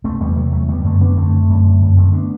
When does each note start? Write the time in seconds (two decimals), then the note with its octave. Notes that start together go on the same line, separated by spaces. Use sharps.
0.04 C3 A3 C4
0.20 E2 G3 B3
0.36 C3 F#3 A3
0.52 E2 F#3 A3
0.68 D3 G3 B3
0.85 F#2 A3 C4
1.00 D3 B3 D4
1.17 F#2 A3 C4
1.34 D3
1.49 F#2
1.66 D3
1.82 F#2
1.98 D3 A3 C4
2.13 B3 D4